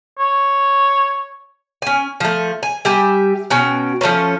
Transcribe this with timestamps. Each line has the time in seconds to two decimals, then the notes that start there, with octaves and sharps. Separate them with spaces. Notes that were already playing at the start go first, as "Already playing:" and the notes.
0.19 C#5
1.82 C#4 G#5
2.20 F3 A3
2.63 G#5
2.85 G3 G4 E5 G#5
3.50 B2 C#4 F#4 G5
4.01 F3 A3 A#3 C#4